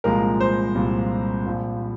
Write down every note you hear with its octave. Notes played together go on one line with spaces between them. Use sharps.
C2 A#2 F3 G#3 A#4
C5
C2 A#2 F3 G#3
A#1 A#2 F3